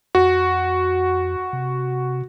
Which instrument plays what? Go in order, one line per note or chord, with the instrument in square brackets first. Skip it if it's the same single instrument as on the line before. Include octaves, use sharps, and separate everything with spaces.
[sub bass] F2 [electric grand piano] F#4
[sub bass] C3